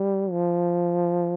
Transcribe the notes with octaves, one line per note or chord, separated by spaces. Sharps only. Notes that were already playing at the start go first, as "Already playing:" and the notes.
Already playing: G3
F3